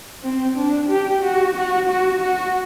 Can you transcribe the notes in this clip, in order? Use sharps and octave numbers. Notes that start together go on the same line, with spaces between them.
C4
D4
G4
F#4
F#4
F#4
F#4